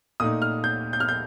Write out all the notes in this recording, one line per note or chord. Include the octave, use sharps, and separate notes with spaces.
A#2 A3 D#4 D#6
F6
G6
G6
F6
G6